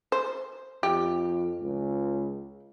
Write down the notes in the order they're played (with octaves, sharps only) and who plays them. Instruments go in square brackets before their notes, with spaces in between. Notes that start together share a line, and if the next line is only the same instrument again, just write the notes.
[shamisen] C5
[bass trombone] F2 [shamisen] G4
[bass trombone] C#2